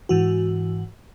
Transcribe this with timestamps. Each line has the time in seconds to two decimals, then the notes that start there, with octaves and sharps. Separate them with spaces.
0.09 G#2 E3 F#4